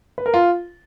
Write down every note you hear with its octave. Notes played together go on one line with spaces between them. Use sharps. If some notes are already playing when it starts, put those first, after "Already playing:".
B4
A#4
F4